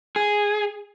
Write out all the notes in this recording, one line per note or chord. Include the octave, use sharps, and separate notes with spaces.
G#4